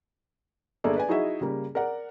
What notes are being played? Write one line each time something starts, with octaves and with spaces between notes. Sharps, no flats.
G1 A#3 G#4 A4 D5
B4 D5 G#5
D#4 E4 F#4 G#4 D#5 E5
C#3 G3 A#3
A#4 D5 F#5